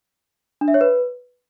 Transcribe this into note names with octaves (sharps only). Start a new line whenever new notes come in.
D4
E5
C#5
B4